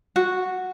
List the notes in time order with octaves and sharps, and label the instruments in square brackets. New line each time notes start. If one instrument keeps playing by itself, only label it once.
[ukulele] F#4